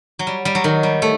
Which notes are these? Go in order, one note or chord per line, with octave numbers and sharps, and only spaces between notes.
F#3
G3
G3
F#3
D#3
G3
A3